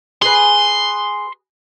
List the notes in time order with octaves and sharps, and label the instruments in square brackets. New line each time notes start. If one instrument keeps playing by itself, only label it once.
[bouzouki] G#4 B4 [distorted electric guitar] C6